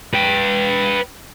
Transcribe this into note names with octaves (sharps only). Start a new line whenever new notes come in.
B4 G5